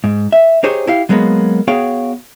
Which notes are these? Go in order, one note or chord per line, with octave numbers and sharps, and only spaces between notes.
G#2
E5
D#4 G4 G#4 C5 C#5
E4 G4 F5
F#3 G#3 A#3 B3
B3 F#4 G#4 C#5 F5 G5